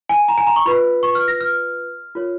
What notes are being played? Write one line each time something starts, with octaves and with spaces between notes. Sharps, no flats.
G#5
A#5
G#5
A#5
C#6
F4 B4 B5
C#6
F6
A#6
F6
F4 A#4 C#5